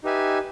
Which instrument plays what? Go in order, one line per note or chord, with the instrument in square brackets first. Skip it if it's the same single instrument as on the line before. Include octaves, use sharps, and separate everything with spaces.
[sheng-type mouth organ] D#4 G4 B4 E5 G#5